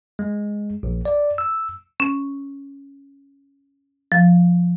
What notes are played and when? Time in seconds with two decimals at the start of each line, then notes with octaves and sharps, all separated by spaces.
0.19 G#3
0.83 A#1
1.05 D5
1.38 E6
2.00 C#4
4.12 F3